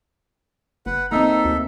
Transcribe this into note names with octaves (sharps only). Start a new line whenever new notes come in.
F#1 B4 F#5
A#3 C4 D#4 A4 E5
D2